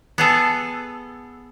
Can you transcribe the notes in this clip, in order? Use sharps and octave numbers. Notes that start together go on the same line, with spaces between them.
B3 G#4 A4